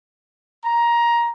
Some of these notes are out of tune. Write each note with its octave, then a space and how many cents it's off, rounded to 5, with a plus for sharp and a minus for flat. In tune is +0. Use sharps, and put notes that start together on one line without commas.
A#5 +15